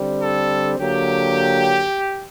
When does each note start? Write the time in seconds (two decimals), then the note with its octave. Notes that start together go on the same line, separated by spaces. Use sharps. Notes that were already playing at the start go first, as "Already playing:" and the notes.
Already playing: D3 G3 C4
0.23 A4
0.78 D3 F#3 A#3 G4